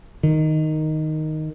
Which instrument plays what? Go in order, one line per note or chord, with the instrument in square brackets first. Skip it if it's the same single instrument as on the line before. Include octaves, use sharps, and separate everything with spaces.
[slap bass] D#3